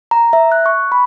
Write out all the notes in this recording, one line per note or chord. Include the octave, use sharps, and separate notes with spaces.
A#5
E5
F#6
C#6
B5